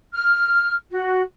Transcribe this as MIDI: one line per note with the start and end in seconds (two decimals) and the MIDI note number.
0.13 0.74 89
0.90 1.21 66